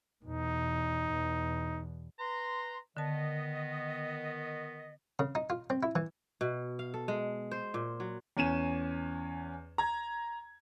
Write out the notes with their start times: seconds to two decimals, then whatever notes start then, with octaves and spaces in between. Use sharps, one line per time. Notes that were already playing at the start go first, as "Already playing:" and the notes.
0.24 E2 B2 D#4
1.11 E2 B2
2.19 B4 A#5 C6
2.97 D3 D#3 B3 D#5 A5
5.19 C#3
5.35 D#4
5.50 F4
5.70 C4
5.83 E4
5.96 E3
6.41 B2
6.79 F5
6.94 A4
7.08 G#3
7.51 C5
7.74 A#2
8.00 F#3
8.37 E2 C#4 D#7 E7
9.78 A#5 G#6